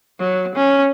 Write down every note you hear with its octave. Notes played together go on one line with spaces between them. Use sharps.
F#3
C#4